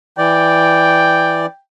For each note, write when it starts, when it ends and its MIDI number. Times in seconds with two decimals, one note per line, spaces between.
0.18 1.46 52
0.18 1.46 74
0.18 1.60 79